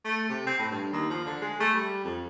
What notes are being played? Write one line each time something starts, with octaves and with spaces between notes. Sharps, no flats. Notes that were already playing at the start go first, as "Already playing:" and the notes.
A3
C3
C4
A2
G2
D#2
F3
D3
G#3
A3
G3
F2